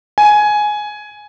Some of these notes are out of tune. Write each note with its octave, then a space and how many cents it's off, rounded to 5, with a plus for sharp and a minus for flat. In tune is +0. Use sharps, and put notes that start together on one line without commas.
G#5 +10